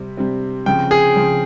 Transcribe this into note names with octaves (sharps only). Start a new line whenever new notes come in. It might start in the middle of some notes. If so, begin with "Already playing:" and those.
Already playing: C3 G3 C4
C3 G3 C4
C#3 F3 C4 G5
G#4
C#3 F3 C4